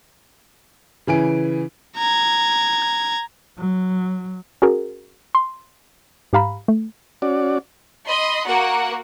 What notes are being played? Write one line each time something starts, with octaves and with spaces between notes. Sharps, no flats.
C#3 E3 G#5 D7
A#5 G#6
F#3
C#4 F#4 G#4 A#4
C6
G#2 G4 F5 A#5 B5
A3
C#4 F#4 D5
D#5 B5 C6
A#3 F#4 A#4 F#5